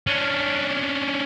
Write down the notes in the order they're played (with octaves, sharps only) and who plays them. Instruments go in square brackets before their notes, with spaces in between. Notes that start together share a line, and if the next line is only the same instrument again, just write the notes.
[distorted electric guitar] C#4 D4